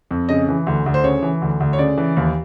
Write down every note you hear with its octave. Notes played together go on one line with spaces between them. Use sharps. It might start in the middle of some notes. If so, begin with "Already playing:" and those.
F2
C#3 D#5
E3
D2
D2
C5
C#3 C#5
E3
D2
D2
C#5
C#3 D5
E3
D#2